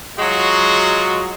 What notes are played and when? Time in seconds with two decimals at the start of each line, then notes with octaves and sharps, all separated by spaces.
0.18 F#3 G#3 F4 F#4